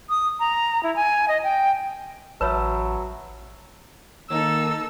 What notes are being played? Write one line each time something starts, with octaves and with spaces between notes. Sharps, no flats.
D#6
A#5
E4
G#5
D#5
G5
A1 F#3 B4 C#5 E5 A5 B5 E6
D#3 A#3 D#4 A4 E6